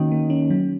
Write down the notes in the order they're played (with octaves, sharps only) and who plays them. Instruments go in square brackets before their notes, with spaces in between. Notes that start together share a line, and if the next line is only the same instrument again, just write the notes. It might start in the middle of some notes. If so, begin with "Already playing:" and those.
Already playing: [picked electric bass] D#3 [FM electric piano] A#3 C#4 F#4
[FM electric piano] A#3
C#4
F#3